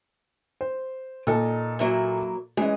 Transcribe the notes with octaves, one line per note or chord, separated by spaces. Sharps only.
C5
A#2 D#4 A4 A5
F#3 A#3 E4
E3 G#3 C#4 D#5